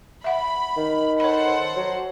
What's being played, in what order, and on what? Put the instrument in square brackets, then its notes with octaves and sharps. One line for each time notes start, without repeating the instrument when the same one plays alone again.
[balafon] E5 F#5 [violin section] B5
[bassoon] D#3
[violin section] A4 C5 F#5 [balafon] C#5 B5
[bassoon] F#3